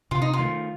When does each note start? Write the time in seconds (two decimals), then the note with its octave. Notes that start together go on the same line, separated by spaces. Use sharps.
0.11 C3 F4
0.22 D#4
0.33 F4
0.39 D#3 A3